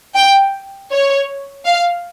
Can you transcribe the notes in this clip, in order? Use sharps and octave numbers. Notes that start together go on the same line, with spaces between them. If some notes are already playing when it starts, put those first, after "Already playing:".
G5
C#5
F5